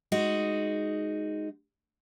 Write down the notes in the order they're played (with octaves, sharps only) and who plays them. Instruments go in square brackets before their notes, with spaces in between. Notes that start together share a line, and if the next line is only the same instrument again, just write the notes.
[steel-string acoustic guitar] G#3 D#4 F#4